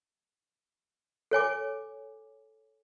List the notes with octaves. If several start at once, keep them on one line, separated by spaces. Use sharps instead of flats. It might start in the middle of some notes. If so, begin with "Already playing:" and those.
A4 C#5 G#5 D6